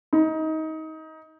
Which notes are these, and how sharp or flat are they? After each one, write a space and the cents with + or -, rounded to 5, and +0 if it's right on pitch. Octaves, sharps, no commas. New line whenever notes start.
D#4 +25